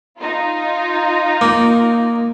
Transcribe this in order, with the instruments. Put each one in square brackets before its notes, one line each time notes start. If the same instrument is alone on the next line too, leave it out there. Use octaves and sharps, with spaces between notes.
[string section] D#4 F4
[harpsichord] A#3